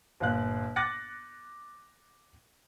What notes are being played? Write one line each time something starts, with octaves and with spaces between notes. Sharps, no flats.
G1 A#2 F5 F#6
D6 F#6 A6 A#6 C#7